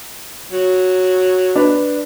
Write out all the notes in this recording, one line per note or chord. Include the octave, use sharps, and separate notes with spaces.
F#3
D4 B4